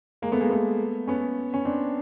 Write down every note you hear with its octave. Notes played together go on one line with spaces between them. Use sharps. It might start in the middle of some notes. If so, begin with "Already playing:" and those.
G#3 A#3
A3 B3
G#3 A#3
A3 B3
B3 C#4
C#4
C4 D4